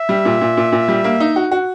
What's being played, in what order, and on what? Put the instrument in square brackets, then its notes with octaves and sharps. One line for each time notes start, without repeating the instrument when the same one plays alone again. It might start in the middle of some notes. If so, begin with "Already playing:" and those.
Already playing: [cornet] E5
[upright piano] G3
A#2
A#2
A#2
A#2
G3
A#3
D#4
F#4
F#4